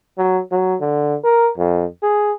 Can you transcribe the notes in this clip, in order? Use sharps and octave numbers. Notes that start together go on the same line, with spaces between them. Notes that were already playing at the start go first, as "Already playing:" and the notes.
F#3
F#3
D3
A#4
F2
G#4